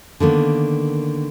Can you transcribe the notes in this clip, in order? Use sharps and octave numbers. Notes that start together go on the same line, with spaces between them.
D3 D#3 A#3 B3